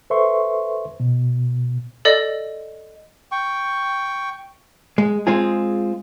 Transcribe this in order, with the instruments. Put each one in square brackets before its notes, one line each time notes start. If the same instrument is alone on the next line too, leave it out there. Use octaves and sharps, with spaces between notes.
[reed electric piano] A4 B4 C5 E5 C6 C#6
B2
[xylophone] A4 D5 D#5
[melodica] G5 C#6
[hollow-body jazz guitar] G#3
G#3 C4 F4 G#4